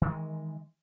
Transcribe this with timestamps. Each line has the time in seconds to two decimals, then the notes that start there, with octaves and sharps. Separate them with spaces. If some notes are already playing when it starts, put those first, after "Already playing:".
0.02 D#3 E3 G#3